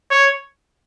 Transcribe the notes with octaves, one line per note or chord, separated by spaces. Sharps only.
C#5